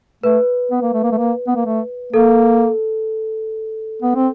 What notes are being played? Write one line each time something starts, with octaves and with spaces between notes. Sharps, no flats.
A3 B4
B3
A#3
A3
A#3
A3
A#3
B3
A#3
A3
A#3 A4
B3
C4